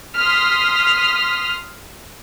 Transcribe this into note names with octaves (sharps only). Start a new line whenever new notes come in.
C6 D#6 F6 B6